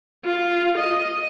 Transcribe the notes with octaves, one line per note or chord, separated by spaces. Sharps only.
F4
D#5